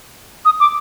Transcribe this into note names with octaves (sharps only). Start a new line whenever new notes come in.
D#6
D6